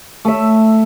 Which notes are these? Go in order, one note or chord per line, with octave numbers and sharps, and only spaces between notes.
A3 E5